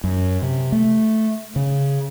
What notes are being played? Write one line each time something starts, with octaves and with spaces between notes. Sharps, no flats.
F#2
C3
A3
C#3